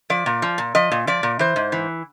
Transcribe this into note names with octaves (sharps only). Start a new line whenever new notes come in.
F3 D5
A#2
F3
A#2
F3 D#5
A#2
F3 D5
A#2
E3 C5
G#2
E3